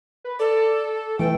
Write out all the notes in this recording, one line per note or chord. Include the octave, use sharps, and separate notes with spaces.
B4
A4 D5
E3 A3 G5